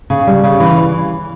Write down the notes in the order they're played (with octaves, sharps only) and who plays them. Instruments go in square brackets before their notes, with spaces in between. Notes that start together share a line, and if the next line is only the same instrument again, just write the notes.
[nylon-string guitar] C#3
G3
C#3
E3